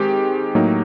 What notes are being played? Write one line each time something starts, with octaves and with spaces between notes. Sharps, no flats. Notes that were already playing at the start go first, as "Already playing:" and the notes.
Already playing: D#3 G#3 C4 G4
A2 F#3 A#3 D#4